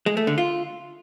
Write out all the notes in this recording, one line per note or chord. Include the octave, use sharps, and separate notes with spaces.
G#3
A3
D3
F4